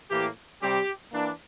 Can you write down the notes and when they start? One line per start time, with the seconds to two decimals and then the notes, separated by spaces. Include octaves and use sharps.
0.10 A2 E3 A#3 G4
0.61 C3 G3 C4 G4
1.12 E3 A#3 D4